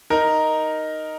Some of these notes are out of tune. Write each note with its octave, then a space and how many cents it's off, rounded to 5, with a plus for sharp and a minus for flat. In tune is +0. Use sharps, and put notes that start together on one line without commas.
D#4 +0 A#4 +0